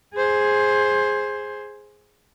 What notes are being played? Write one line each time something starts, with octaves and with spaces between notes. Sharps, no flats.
G#4 C5